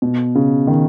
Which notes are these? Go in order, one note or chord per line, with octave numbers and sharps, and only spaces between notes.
B2
C#3
D#3